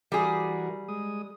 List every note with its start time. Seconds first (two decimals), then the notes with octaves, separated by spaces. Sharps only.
0.12 E3 G3 F#4 G#4 A#4
0.88 G#3 D#6